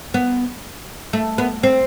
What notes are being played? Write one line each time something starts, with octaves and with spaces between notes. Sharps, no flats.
B3
A3
B3
C4